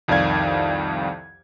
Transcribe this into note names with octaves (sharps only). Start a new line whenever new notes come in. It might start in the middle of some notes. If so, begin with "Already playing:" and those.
C2 F2 D#3 D5 F5 G#6